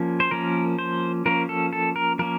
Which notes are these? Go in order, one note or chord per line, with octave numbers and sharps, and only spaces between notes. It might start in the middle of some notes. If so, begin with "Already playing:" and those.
Already playing: F3 A#3 C#4
C5
F3 A#3 C#4 A#4
C5
F3 A#3 C#4 A#4
A4
A4
A#4
F3 A#3 C#4 A#4